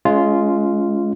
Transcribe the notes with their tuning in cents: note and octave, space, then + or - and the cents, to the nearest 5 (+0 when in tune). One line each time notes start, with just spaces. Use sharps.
G#3 +20 C#4 +20 F4 -10